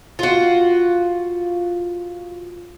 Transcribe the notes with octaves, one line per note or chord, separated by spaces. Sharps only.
F4 F#4